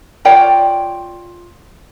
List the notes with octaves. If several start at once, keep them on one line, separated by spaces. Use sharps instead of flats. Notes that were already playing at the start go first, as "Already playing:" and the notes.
F4 C#5 D5 G5